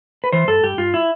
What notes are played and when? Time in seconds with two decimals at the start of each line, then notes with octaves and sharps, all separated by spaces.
0.24 B4
0.32 E3 C5
0.48 G2 A4
0.63 G2 G4
0.77 G2 F4
0.94 E4